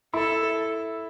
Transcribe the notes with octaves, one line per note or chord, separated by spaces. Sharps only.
E4 A4